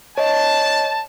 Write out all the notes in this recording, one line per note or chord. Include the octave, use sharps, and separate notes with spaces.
C#5 D#5 A5